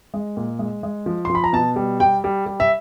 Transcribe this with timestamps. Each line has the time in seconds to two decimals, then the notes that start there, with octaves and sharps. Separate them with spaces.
0.14 G#3
0.37 A#2
0.59 G#3
0.83 G#3
1.06 F3
1.25 C6
1.30 F3
1.35 B5
1.44 A#5
1.53 B2 A5
1.76 G3
2.00 G3 G5
2.24 G3
2.46 G3
2.60 E5